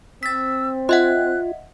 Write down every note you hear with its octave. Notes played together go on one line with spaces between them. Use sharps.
C4 E6 A6 B6
F4 D#5 E5 F#5 F#6